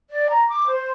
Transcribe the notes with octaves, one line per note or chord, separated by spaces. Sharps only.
D5
A#5
D6
C5